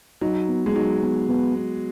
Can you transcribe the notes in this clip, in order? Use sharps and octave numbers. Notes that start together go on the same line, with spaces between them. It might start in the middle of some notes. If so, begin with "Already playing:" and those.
F#3 D#4
B3
G#3
F#3 D#4
B3
B3
B3